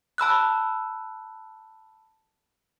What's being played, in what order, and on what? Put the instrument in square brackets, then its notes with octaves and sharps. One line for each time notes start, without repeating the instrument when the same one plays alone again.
[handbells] A5 B5 E6 F#6